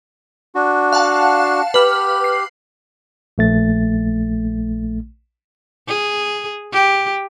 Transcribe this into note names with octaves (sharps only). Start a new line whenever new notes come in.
D4 F#4
F5 F#5 A5
G4 B4 F6
C7
A#1 A3 A6
G#4
G4